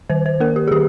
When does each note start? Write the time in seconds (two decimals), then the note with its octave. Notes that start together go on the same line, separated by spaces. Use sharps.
0.10 D#3 C5
0.26 C5
0.40 A#3 A#4
0.56 G4
0.68 G#4
0.71 D#3 G4